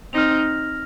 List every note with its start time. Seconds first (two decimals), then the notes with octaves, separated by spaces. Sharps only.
0.13 C4 D#4 F6 A#6 F7